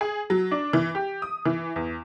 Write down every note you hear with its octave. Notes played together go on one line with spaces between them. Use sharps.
G#4
F#3
D4
E3
G4
D#6
E3
E2